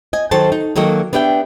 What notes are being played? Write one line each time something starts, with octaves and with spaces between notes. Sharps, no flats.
D#5 G#5
D#3 F#3 A4 C5 A5
D#4
D#3 F#3 A#3 A4 D#5
B3 D4 G4 E5 G5